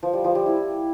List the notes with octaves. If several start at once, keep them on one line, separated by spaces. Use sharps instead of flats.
F3
G3
F3
G3
E4